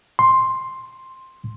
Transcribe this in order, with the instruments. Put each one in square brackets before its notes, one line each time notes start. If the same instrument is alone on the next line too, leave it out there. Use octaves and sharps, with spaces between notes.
[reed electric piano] C6